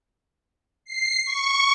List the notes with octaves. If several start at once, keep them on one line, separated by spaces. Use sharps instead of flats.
C7
C#6